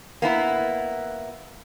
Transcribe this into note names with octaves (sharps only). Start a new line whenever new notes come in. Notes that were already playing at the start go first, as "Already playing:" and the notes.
A#3 B3 E4